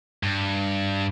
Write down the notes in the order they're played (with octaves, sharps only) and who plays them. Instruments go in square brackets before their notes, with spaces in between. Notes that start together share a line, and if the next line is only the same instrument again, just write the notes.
[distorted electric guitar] G2